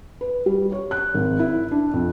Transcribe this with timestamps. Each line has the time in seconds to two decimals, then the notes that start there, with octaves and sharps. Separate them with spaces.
0.21 B4
0.46 G3
0.72 C#5
0.91 F#6
1.14 G#1
1.39 E4
1.71 D4
1.94 F2